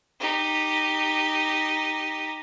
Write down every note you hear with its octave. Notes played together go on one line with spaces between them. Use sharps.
D#4 G4